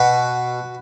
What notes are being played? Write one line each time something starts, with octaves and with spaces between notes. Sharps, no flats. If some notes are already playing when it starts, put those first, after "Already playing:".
Already playing: B2 F#4 B4